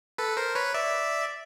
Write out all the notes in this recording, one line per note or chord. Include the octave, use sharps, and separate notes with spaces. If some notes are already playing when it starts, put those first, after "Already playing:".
A4 B4
A#4 C5
B4 C#5
D5 E5